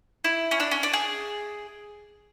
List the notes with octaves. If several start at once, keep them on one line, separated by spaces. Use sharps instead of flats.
E4
C#4
D4
C#4
D4
G#4